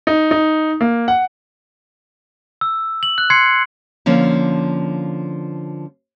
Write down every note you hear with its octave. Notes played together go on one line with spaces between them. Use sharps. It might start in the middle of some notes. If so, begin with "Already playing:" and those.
D#4
D#4
A#3
F#5
E6
F#7
F#6
C6 G#6 C7 C#7
D3 F3 A#3 C#4